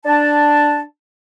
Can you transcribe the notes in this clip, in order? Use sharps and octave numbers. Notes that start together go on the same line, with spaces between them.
D4 A5